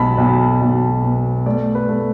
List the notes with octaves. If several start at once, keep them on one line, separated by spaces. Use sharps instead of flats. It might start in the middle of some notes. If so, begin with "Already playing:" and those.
Already playing: B1 A5 B5
B1
B1
B2
A3 D5
B4
A3